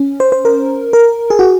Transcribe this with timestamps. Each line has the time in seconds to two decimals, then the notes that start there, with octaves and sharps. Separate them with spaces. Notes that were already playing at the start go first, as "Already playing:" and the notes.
Already playing: C#4
0.20 C5
0.32 C5
0.45 A#4
0.93 A#4
1.30 G#4
1.39 F#4